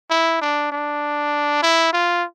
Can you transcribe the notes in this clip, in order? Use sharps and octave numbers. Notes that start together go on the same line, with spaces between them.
E4
D4
D4
E4
F4